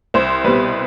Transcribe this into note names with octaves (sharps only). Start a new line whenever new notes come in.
C2 C5
B2 G3 B4